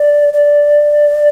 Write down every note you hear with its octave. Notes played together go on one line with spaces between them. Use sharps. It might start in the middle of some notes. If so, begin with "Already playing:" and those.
Already playing: D5
D5